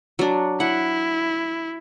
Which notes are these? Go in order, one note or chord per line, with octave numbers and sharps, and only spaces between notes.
F#3 D4
E4 F#5